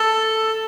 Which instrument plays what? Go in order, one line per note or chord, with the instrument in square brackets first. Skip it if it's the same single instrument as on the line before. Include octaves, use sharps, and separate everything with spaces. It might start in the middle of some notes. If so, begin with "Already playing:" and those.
Already playing: [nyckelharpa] A4